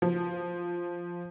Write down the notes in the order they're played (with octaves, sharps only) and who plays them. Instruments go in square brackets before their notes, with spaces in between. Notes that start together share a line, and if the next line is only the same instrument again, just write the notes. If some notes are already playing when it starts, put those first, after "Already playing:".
[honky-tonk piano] F3